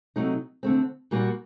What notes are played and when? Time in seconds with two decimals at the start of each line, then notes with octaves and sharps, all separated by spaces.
0.16 C3 F#3 A3 D#4
0.63 D3 A3 C4
1.11 A#2 G3 A#3 F#4